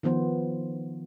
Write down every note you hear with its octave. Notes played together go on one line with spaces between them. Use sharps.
D#3 F3 B3 C5